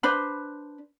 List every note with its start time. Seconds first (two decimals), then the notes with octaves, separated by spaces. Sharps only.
0.03 D4 B4 C5 B5